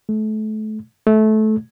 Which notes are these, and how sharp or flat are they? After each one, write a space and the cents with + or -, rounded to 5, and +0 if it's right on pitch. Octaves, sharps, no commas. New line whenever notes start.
A3 -30
A3 -20